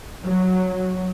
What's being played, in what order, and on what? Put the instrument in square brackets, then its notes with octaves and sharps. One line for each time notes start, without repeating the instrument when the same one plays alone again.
[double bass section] F#3